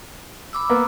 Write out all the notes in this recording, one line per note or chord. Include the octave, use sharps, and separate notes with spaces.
B5 D6 E6
A#3 B3